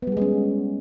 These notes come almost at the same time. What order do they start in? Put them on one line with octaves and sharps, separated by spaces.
B3 G3 G#4 G#3 C#4